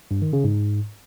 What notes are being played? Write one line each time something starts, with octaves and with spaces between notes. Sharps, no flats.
G2
D#3
C#3
G#2